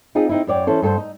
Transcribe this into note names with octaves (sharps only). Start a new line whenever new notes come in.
C4 D#4 F4 G#4
C4 D#4 E4
F#2 C#5 D5 G5
E3 C#4 E4 A4 C5
G2 A4 A#4 C5
D#4